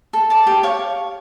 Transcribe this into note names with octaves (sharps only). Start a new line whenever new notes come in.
A4
D5 A5
G4
C#5 F5 C#6